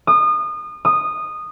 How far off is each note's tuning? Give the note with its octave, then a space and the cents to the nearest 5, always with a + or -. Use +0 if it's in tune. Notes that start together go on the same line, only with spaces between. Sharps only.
D#6 -30
D#6 -15